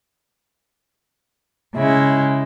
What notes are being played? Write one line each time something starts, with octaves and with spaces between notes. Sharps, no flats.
C#3 G#3 E4